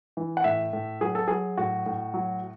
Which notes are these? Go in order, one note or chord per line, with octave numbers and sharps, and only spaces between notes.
E3
F#5
A2 E5
A2
F#3 G#4
A4
F#3 G#4
A2 F#4
A2
F#3